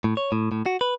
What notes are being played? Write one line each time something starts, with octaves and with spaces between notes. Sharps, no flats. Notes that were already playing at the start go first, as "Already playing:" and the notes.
A2
C#5
A2
A2
F#4
B4